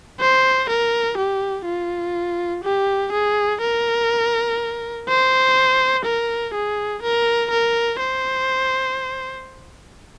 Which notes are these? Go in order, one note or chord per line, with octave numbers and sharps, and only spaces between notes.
C5
A#4
G4
F4
G4
G#4
A#4
C5
A#4
G#4
A#4
A#4
C5